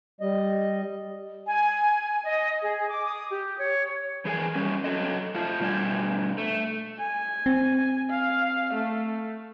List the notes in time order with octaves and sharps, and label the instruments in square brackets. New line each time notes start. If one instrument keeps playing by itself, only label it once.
[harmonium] G3 D#5
[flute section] G#5
D#5
G#4
D6
D#6
G4
C#5
[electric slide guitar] E3 G#4 A#4 G#5
G3 C#4
F#3 A4 D#5
A3 F4 A5
B2 G3 D4 G#5
A3
[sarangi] G#5
[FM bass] C4
[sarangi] F5
A3